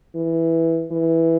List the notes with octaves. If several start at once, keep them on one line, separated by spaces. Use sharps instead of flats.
E3
E3